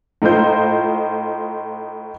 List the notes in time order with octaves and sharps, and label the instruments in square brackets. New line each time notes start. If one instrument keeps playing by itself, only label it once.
[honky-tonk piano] A2 D#4 F4 C5 G6